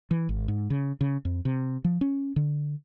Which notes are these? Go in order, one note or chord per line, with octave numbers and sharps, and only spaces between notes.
E3
G#1
G#2
C#3
C#3
F2
C3
F3
C#4
D3